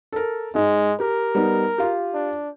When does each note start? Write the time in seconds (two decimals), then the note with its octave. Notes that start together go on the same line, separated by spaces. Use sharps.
0.12 A4 A#4
0.55 G#2 G#3
1.00 G4 A#4
1.35 G3 B3 D#4
1.78 F4 G4
2.14 D4